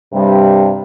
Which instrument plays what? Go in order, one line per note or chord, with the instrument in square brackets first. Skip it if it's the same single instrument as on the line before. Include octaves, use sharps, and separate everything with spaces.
[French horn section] G2 C3 G3